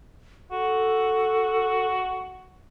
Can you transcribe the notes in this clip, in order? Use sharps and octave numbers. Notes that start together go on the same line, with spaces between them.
F#4 A4